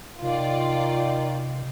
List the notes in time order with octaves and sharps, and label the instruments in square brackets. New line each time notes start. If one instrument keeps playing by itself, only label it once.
[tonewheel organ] C3 [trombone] D#3 [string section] F4 D5